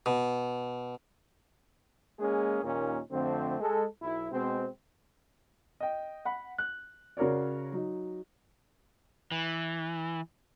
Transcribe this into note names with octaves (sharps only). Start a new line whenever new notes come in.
B2
G#3 A#3 C#4 G#4
D#2 A#2 C#4 D#4 A#4
F2 D3 A3 C4
G#3 A4
B1 E4
B2 G#3 C4
D#5 G5
F#5 B5
F#6
C#3 F#4 A#4 C#5 D5
F#3 D#4
E3